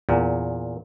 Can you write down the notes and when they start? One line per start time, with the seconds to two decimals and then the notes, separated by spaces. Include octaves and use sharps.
0.09 E2 A#2